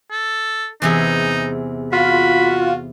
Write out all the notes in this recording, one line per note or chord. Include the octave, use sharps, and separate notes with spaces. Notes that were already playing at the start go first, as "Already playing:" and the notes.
A4
E2 C3 D#4 G#4
F4 F#4 B5